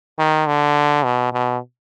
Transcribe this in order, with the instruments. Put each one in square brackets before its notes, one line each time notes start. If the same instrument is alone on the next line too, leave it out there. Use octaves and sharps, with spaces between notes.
[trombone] D#3
D3
B2
B2